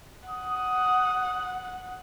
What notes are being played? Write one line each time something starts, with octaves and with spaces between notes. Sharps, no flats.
F#5 D#6